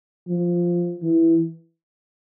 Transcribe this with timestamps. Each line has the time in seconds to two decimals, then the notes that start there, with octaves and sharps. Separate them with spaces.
0.28 F3
1.02 E3